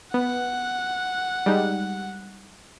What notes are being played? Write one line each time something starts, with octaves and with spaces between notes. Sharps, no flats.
B3 F#5
G3 G#3 D#4